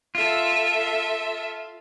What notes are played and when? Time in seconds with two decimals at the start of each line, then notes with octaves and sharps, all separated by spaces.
0.15 F4 A4 E5